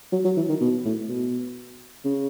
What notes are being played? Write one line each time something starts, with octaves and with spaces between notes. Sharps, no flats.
F#3
F#3
E3
D#3
B2
A2
B2
C#3